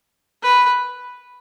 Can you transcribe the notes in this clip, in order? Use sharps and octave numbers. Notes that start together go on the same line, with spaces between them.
B4